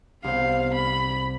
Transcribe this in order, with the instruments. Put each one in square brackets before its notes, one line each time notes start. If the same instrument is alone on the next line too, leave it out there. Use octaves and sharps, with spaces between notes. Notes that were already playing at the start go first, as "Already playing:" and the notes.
[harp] C2 C5 [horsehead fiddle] B3 F5
[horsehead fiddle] B5